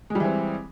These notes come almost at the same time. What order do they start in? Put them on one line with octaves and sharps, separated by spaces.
G#3 G3 E3 C4